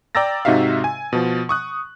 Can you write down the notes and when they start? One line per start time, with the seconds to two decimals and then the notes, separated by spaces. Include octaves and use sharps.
0.15 D5 G5 A#5 E6 A6 A#6
0.45 G#2 C3 D#4 F#4 E5 F5
0.84 G#5
1.13 B2 F3
1.49 C#6 D#6 F#6